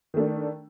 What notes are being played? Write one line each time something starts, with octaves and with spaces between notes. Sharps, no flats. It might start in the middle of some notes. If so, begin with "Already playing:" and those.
D#3 A3 D4